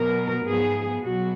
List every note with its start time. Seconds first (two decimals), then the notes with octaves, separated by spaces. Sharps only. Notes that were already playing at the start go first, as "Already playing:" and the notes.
Already playing: B2 F#3 B3 A#4
0.47 G#2 F3 B3 G#4
1.03 B2 F#3 F#4